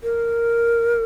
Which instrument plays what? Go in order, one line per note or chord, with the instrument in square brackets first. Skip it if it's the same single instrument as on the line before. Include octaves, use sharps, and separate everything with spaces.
[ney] A#4